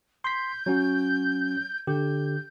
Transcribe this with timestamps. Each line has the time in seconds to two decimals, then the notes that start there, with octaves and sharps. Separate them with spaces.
0.24 C6 G6 B6
0.66 F#3 C#4 F#4
1.87 D3 G4 G6